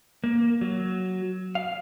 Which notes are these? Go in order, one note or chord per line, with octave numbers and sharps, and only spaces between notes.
A#3
F#3
F5